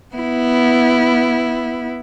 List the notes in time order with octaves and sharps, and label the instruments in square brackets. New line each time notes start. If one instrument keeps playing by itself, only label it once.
[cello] B3 E4